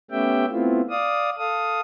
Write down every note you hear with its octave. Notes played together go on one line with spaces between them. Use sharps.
A3 B3 C#4 G4 E5 G5
A3 B3 C4 E4 F4
D5 F5 D#6
A4 F5 D#6